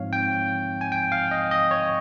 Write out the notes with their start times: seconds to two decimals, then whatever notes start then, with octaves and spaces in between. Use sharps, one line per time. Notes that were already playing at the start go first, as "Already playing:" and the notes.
Already playing: G#2 F3 C4 C#5 F5
0.13 G5
0.81 G#5
0.92 G5
1.12 F5
1.31 D#5
1.51 D#5
1.71 C#5